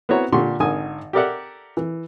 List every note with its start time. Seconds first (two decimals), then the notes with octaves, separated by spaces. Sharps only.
0.09 B3 C4 E4 F#4 C#5 A#5
0.32 A#2 D3 G4 C6 C#6
0.60 G#1 D3 D#3 G#5 D#6
1.13 G4 A4 A#4 D5 E5 F#5
1.77 E3